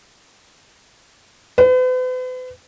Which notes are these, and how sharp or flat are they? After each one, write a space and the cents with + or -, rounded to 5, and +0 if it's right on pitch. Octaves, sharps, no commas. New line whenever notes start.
B4 +45